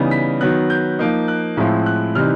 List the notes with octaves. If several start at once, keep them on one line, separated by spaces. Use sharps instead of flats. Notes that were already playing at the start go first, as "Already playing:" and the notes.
Already playing: C#3 E3 G3 B3 D#4
B6
D#3 F#3 B3 F#6
G6
F3 A#3 D#4
F#6
A2 F3 G#3 C4 E4
F#6
C3 E3 G3 C4 D#4 F6